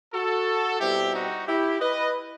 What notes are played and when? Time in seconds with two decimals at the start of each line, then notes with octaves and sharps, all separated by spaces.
0.14 F#4 A4
0.80 B2 G3 C4 E4 G4
1.14 D#4 F#4
1.47 E4 G4
1.81 B4 D#5